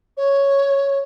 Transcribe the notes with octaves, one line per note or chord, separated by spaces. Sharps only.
C#5